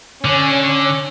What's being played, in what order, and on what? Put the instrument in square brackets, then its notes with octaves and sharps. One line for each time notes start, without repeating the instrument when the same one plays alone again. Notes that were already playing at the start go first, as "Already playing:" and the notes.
[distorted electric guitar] D3 [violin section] C#4